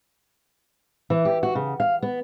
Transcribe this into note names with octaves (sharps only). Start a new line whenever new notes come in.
E3
G4
F#4
C#3
F5
B3